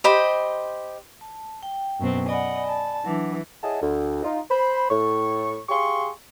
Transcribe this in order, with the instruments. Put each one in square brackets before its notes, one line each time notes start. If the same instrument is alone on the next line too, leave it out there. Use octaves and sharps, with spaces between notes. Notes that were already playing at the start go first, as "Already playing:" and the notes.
[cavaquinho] G4 C5 D#5 B5
[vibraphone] A5
G5
[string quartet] F#2 B2 C4
[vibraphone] D5 G#5 B5 [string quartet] D#5 F#5
[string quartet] A5
[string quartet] E3 [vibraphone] F#3 D4
[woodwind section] E4 G#4 C#5 D#5 F#5 A5
D2
D#4 F4
C5 B5
A2 C#6
G4 G#4 F5 C6 C#6